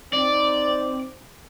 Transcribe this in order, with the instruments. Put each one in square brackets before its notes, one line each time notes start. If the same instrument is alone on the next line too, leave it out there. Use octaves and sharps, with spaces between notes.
[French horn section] C4 D#4 [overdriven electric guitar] D5